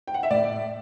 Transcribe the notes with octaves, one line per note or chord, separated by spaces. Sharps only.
G5
F#5
E5
A2 D5